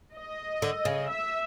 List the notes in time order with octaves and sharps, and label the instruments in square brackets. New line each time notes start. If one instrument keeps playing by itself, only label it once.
[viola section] D#5
[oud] D3
C#3
[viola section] E5